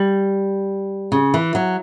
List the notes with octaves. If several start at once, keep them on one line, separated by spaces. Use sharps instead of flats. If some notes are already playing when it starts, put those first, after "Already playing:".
Already playing: G3
C#3
E3
F#3